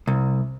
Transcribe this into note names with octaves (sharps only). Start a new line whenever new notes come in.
C2